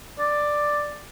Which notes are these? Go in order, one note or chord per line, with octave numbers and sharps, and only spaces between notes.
D5